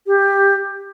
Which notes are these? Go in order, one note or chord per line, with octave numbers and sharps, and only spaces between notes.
G4